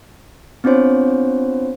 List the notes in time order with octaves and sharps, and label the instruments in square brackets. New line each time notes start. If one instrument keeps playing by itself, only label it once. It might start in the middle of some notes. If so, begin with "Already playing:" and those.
[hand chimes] B3 C4 D4 F4 C5 C#5